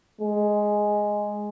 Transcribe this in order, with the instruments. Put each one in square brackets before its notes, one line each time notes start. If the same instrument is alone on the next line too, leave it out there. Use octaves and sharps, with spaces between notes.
[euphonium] G#3